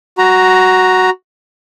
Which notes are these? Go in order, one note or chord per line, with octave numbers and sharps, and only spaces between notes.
F#4 A#5